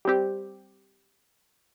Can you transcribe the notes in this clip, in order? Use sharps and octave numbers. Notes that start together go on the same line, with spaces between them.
G3 C4 G4